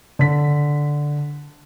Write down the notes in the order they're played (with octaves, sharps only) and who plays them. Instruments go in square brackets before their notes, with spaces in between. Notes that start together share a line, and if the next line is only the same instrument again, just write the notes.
[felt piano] D3 B6